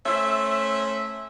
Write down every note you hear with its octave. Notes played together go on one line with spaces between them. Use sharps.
A3 C#4 C5 E5